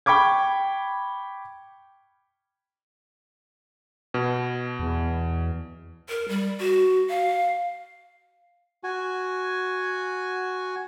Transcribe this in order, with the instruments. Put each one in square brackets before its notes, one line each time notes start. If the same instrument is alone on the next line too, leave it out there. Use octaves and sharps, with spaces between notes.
[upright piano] G5 B5 C#6 D6 G#6
[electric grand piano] B2
[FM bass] E2
[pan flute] A#4
G3
F#4
F5
[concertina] F#4 G#5